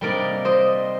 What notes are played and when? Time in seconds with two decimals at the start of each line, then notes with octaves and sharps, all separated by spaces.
0.01 C3 G3 A#3 D#4 A#4 D5
0.45 C5 D#5